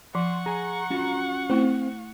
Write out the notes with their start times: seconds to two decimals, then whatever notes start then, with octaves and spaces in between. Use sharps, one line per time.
0.15 F3 F#5 C6 C#6
0.46 G#4 G#5 A#5
0.90 C#4 F4 F#4
1.50 A3 C4 E4